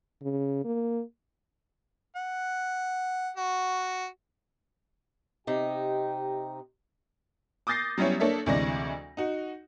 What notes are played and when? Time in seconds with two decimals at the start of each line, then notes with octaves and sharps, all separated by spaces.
0.23 C#3
0.65 A#3
2.16 F#5
3.36 F#4
5.47 C3 D#4 G4 D#5 G5
7.67 D6 D#6 G6 A6 A#6 C7
7.98 F#3 G3 B3 C#4 E4 C#5
8.20 A#3 D4 A4 C#5 E5
8.46 D2 C3 E3 G#3 D5 A#6
9.17 D#4 F#4